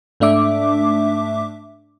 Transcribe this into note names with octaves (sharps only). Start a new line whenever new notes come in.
G#2 A3 D4 E5 D6